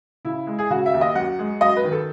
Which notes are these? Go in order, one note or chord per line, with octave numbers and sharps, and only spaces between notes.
C#3 E4
G#3
G#4
C#3 F#4
E5
D#2
D#5
F#2 F#5
G#3
F#2 D#5
B4
D#3
A4